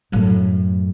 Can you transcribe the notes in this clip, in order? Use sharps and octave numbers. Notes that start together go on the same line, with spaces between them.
F#2 A2